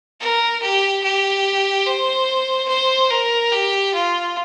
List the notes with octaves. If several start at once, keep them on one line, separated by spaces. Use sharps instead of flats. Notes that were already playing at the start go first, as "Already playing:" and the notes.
A#4
G4
G4
C5
C5
A#4
G4
F4